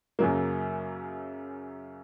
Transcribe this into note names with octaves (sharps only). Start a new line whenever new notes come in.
F#2 C#3 F#3 A#3